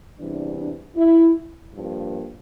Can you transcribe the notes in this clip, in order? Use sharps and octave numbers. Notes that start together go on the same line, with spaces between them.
E2 C3 E3 G3 D4
D4
E4
G2 F3 A#3